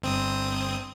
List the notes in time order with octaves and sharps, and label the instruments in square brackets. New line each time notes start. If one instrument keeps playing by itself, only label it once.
[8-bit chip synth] G1 C4 D#6